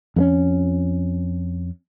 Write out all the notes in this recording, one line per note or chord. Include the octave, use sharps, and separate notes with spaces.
F2 A#3 C#4